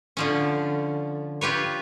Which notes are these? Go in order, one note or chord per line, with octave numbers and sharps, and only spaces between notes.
D3 F3 C#4
F4 G4 B4 C#5